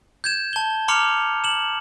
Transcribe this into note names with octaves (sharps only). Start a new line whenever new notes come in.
G6 G#6 E7
A5 G7
A#5 C6 D6 F6 C#7 F7
E7 F#7